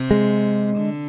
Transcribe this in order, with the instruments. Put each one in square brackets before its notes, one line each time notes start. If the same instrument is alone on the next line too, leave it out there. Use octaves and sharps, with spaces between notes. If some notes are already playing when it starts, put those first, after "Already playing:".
Already playing: [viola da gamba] C3
[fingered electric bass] G#3
[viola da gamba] D3